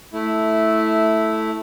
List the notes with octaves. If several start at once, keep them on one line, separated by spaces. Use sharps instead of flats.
A3 E4